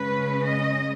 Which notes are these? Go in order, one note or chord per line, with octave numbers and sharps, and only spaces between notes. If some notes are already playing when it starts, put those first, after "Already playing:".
Already playing: C#3 G#3 C#4 B4
D#5